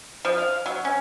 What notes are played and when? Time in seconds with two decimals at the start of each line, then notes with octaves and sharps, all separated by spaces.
0.25 F3
0.38 F5
0.66 F#3
0.85 C#4